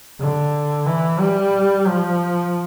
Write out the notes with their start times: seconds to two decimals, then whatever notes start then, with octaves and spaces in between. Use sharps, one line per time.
0.20 D3
0.86 E3
1.20 G3
1.87 F3